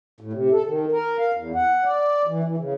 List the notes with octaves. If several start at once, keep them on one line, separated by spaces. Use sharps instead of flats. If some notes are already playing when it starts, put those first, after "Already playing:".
A2
C3
A4
D#3
A#4
F5
E2
F#5
D5
E3
E3
C#3